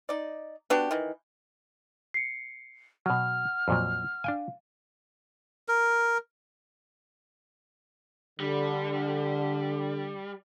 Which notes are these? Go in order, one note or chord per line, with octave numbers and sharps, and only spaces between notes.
D#4 D5
B3 D4 F#4 G4
D#3 E3
C7 C#7
B2 F#3 F#5 F6
F2 A#2 F#3
D4 F5 G5 G#5
A#4
D3 G3